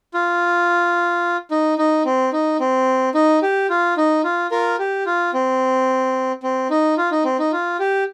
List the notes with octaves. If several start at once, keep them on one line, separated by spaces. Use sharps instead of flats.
F4
D#4
D#4
C4
D#4
C4
D#4
G4
F4
D#4
F4
F4 A#4
G4
F4
C4
C4
D#4
F4
D#4
C4
D#4
F4
G4